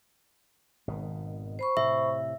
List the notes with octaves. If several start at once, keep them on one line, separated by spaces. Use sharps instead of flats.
G#1 B2 D#3
C5 B5 C#6
A2 C3 E5